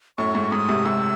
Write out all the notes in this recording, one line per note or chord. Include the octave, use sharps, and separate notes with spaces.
F#2 A2 C#6
G#2
G#2 D#6
G#2 C3
G#2 C3 E6